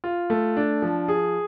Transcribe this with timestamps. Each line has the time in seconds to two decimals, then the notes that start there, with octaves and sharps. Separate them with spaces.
0.04 F4
0.30 A3
0.57 D4
0.82 F3
1.08 G#4